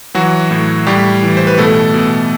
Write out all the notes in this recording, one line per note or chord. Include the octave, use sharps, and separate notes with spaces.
E3 F#3 F#4
A2
A2 G3 G4
E3
C5
B4
B2 A3 A4
B2